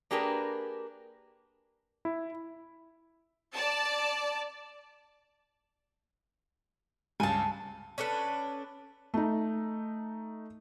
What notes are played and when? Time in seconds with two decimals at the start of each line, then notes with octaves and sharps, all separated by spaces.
0.11 A#3 D4 G4 G#4 A#4 B4
2.05 E4
3.54 D5 A5
7.20 C#2 G2 G#5 A5
7.98 C#4 D4 A4 B4
9.14 A3 D#4